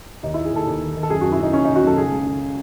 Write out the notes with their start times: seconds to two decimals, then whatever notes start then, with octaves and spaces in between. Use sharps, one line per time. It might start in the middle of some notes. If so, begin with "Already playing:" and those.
0.23 D#2 D#4
0.34 D#2 E4
0.45 G#4
0.52 D#2 A4
0.67 D#2
0.81 D#3
0.96 D#3
1.03 A4
1.10 F#2 G#4
1.21 F#2 F#4
1.32 E4
1.39 F#2 D#4
1.53 F#2 C#4
1.65 D#3 D#4
1.76 F#4
1.83 F#2 A4
1.97 C#3 G#4
2.12 C#2
2.27 C#3